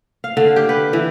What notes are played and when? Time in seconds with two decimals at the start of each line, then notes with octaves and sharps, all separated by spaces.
0.24 F5
0.37 D3
0.56 G4
0.69 B4
0.93 E3